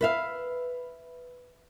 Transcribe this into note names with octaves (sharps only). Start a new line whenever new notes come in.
B4 E5 F5